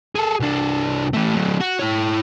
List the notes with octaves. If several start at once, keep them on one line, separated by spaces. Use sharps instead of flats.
G#4 A4
C2 D4
E3 A3
F#3 A3
F#4
E4 C#5